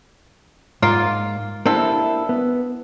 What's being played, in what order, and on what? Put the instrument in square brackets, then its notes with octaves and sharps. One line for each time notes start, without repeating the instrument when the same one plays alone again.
[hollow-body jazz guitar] G#2 [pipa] A#3 F4
[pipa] C3 A4 [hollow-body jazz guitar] A#3 D4 E4
[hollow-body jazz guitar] B3